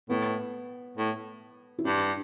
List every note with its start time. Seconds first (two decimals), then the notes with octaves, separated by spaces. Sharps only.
0.10 A2 B3
0.97 A2
1.79 E4
1.85 G2 D4